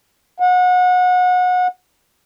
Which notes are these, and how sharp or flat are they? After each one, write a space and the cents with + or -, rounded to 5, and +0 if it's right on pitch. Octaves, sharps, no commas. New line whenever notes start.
F#5 -30